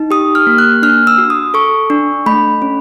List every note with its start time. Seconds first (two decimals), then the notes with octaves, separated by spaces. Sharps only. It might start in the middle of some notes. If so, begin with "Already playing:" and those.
Already playing: D#4
0.11 G4 D#6
0.35 F6
0.47 A#3
0.58 F#6
0.82 D4 F6
1.07 E6
1.18 F#4
1.30 D#6
1.54 A4 C#6
1.90 D4
2.26 A3 B5
2.62 C#4